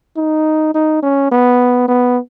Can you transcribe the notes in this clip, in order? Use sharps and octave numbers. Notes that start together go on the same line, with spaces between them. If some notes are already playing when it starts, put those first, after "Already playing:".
D#4
D#4
C#4
B3
B3